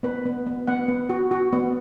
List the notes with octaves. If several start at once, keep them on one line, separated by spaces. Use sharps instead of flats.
B3 B4
B3
B3
B3 F#5
B3
F#4
F#4
B3